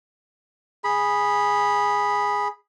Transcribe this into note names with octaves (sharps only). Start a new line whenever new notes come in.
G#4 B5